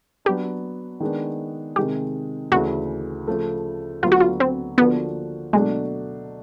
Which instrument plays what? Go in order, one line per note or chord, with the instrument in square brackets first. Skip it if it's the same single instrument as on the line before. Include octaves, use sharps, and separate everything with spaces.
[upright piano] F#3 B3 D4 [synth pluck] G4
[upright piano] D#3 G#3 B3 D4
[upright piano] C3 D#3 G#3 [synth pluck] G4
[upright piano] D2 C#3 E3 A3 C#4 [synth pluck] F#4
[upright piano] C#3 F3 A3
[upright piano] D2 D3 F#3 B3 [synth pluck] F4
[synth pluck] F#4
F4
C4
[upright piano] D3 F3 A#3 D4 F#4 [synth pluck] B3
[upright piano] B2 F#3 A3 D4 [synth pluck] G#3